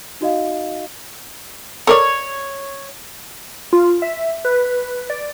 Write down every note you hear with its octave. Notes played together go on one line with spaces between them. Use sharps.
D#4 F#4 D#5 F5
A4 A#4 C#5 D5
F4
E5
B4
D5